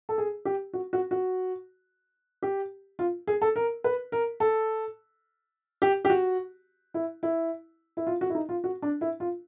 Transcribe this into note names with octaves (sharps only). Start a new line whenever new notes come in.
A4
G#4
G4
F#4
F#4
F#4
G4
F4
G#4
A4
A#4
B4
A#4
A4
G4
G4
F#4
E4
E4
E4
F4
F#4
E4
D#4
F4
F#4
D4
E4
F4